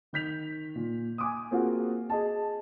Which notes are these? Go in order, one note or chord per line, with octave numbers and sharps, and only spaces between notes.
D#3 G6 B6 F7
A#2
G#5 D6 D#6
A#3 C4 F4 F#4 G#4
G#4 D#5 A5